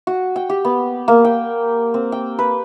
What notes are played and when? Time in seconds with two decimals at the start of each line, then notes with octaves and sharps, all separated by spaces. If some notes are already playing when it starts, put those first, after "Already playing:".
0.07 F#4
0.36 G5
0.50 G4
0.65 B3
1.08 A#3
1.25 G5
1.94 C4
2.12 G5
2.39 B4